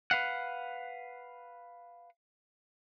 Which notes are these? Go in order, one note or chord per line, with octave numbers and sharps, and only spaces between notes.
B4 F5 F#5